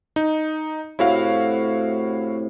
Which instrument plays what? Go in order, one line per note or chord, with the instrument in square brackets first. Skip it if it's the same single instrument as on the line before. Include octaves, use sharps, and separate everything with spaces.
[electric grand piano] D#4
[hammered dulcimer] A2 C3 [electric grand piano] E4 F#4 F5